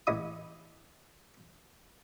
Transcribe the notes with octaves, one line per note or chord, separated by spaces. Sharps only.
A1 E3 D#5 B5 D#6